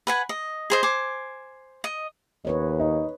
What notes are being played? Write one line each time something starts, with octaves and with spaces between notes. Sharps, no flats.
B4 F#5 G#5
D#5
G#4 C5 D#5
C5 G#5 D6
D#5
D#2 B4 C#5 D#5
D#4